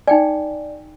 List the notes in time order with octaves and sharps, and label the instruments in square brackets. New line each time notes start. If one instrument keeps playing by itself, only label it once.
[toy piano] D#4 G5 G#5 [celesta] D5